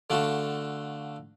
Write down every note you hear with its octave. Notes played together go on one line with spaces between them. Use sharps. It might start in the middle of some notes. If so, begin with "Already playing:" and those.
D3 A3 F4 F#4